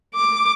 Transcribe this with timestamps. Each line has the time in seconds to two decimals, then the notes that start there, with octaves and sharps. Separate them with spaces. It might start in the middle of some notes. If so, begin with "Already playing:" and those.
0.15 D6